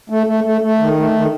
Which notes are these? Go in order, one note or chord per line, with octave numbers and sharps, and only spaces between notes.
A3
A3
A3
A3
D#3
A3
D#3